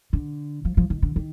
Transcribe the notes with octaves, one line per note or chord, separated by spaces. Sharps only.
D3
F3
F3
D#3
D3
D#3